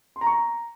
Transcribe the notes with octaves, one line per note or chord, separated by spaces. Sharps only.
C6
A#5
C#6
A#5